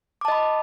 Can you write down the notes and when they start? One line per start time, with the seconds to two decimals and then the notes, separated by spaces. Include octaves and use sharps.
0.21 D6
0.25 A5
0.28 D#5
0.32 B5